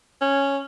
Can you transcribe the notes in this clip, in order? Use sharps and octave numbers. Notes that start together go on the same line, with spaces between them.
C#4